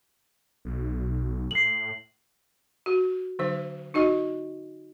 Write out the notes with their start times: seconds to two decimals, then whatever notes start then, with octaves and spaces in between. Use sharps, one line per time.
0.65 B1
1.51 A2 C7 F#7
2.86 F#4
3.39 D3 F#3 C5
3.94 D#4 F#4 D#5